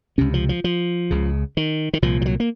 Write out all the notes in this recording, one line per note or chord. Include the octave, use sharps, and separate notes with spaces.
C#2 C3 C#4
F3
F3
F3
C#2 C#3
D#3
D#3
C2 A#2 F3
F3
F#3
A#3